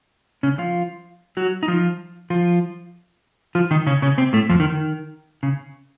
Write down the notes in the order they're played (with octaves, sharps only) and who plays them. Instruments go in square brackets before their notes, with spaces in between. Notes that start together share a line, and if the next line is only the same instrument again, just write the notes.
[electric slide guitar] C#3 C#4
F3 F4
F#3 F#4
D#4
F3 F4
F3 F4
F3 F4
D#3 D#4
C#3 C#4
C#3 C#4
C3 C4
A2 A3
F2 F3
D#3
D#3
C#3